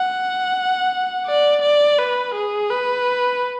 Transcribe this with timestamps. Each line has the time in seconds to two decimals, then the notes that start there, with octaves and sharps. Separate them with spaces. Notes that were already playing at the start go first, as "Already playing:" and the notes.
Already playing: F#5
1.26 D5
1.62 D5
1.99 B4
2.34 G#4
2.70 B4